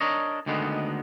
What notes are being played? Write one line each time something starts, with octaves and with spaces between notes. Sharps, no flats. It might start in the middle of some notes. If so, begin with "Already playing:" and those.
D4 A#4 C#5 D#5
D2 D3 D#3 G#3 B3